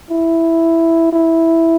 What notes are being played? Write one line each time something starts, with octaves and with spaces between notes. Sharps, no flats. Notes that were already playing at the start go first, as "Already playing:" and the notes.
E4
E4